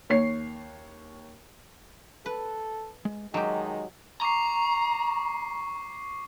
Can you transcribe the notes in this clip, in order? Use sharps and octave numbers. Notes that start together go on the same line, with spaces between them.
D#2 C#5 C7
A4 B4
G#3
D#3 F#3 G#3 G4 G5 A5 C6
A#5 C#6 D6 C7